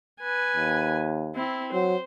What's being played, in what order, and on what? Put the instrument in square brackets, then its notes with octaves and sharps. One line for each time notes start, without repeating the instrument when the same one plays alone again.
[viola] B4 G#5
[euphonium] D#2
[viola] C4 E4
[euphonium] F#3 [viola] C5